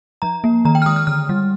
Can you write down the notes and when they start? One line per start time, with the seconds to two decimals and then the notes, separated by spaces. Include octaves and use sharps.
0.22 F3 A#5
0.44 A#3
0.65 D#3 A#5
0.75 G5
0.82 F6
0.86 G#3 D#6
0.96 F6
1.07 D3 F6
1.29 G3